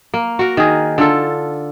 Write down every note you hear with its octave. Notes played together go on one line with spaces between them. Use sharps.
A#3
F#4 A#4
D#3 G#4
D3 F4 A4